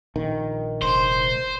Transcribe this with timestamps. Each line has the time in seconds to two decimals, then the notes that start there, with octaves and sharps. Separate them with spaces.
0.16 A#1 D#3
0.82 F1 C5